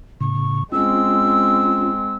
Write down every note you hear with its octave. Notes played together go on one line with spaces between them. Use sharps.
A2 C#3 C#6
G#3 C4 C#4 F4 E6